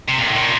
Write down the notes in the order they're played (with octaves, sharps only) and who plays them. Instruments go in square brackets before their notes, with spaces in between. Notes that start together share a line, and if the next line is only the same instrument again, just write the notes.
[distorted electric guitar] C3
A#2
A2
A#2